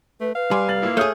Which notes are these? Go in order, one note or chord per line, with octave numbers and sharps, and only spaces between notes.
A3 B4
B4 F5
G3 G#5 C6 D6
F1 A6 F#7
A#2 A#3 E4
A3 G#4 C#5 D#6 F6 G6